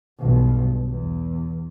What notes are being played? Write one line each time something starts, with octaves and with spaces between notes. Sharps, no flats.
B1 G2
E2